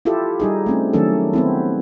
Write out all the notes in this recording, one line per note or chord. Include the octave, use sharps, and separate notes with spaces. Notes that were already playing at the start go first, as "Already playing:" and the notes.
E4 F4 G4 A4
G3 D#4 G#4
A3 C4 C#4
D#3 F#3 A3 C#4 D4 A4
B3 C4 E4